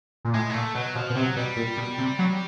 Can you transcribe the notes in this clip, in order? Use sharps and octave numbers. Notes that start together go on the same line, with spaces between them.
A#2
A2 G#3
A#3
A#2 A3
B2 F#3
B2 F3
B2
C3 F#3
B2 G3
A#2
B2
C3
F#3